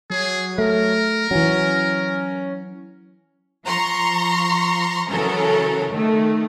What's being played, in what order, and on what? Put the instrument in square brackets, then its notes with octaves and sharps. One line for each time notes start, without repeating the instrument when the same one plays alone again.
[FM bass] F#3 [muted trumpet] G#4
[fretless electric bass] A3 [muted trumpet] A#4
[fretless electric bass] E3 F#3 [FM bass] C#4
[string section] F3 A#5 C6 C#6
C#3 E3 F#3 C#4 A4 A#4
D#3 A3